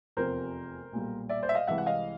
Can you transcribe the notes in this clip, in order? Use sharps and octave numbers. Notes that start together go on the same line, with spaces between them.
F1 E2 C3 F3 A#4 C5
B1 A#2 G3
D5 E5
C5 D5
E5
D#5 F5
C2 C3 E3 G#3 E5 F#5
F#5
D#5 F5